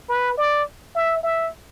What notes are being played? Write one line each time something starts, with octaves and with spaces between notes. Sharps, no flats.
B4
D5
E5
E5